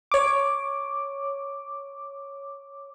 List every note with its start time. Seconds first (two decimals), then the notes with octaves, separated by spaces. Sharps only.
0.12 C#5 D6